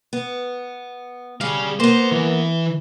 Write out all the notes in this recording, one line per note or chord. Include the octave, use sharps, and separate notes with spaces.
B3
G3 G#4 F5
A#3 B3 C5
E3